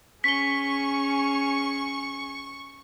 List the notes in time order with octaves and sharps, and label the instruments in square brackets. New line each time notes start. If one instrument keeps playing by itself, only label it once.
[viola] C#4 G#4 [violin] C#6 [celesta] B6 G7